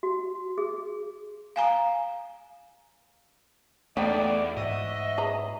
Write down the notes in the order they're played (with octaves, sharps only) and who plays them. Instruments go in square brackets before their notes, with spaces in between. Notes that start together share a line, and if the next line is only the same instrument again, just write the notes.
[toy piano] F#4
G#4
[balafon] F5 G#5 A#5
[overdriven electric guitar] E2 [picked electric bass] A3 [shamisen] B3 D#4 G5 [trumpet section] F#4 D5
[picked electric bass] G#2 [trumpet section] F#4 E5 [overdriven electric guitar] D#5
[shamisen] G#4 B4 A#5